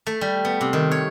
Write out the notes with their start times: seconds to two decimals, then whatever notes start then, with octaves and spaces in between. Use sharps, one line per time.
0.07 A3
0.21 G3
0.45 B3
0.61 C3
0.73 D#3
0.91 C#5